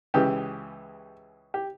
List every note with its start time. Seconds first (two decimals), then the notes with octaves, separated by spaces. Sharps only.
0.14 C#2 C#3 E3 G4
1.54 G4